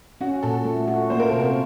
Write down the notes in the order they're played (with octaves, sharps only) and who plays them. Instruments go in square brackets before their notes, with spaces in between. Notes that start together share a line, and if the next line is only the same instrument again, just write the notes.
[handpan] C#4 [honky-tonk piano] F#4
[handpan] A#2 [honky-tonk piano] A4
[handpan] A3
F#4
[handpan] A#3 [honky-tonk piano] C5
[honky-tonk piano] A#4
[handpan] C3 [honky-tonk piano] A4
[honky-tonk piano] A#4